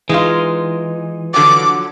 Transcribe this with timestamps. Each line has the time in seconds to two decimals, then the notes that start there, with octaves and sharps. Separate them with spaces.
0.09 E3 G#3 D#4 F4
1.34 D3 F3 F#3 D6